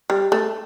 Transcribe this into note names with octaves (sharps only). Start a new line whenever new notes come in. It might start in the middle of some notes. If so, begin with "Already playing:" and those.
G3
A3